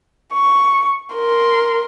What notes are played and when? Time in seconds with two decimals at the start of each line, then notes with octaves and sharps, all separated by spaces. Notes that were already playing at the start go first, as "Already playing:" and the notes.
0.34 C#6
1.14 A#4 C6